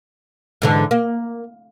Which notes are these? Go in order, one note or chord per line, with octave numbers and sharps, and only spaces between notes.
G#2 D3 E3
A#3